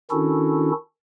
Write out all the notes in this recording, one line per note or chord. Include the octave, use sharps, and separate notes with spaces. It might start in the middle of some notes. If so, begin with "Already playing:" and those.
D#3 C#4 D4 E4 F#4 A4